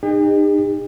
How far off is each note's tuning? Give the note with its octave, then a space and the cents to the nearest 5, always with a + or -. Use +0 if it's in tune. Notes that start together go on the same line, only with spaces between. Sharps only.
D#4 -35 G4 +45